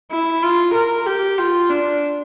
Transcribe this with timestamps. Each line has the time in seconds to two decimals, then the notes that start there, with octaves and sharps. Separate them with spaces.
0.11 E4
0.42 F4
0.74 A#4
1.06 G4
1.38 F4
1.70 D4